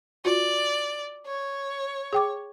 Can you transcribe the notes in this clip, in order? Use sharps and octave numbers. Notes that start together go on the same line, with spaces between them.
F4 F#4 D5
C#5
G#4 G5 D6